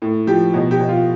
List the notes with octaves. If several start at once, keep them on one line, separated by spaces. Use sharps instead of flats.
A2
F3 G4
B2
G4
B2
F4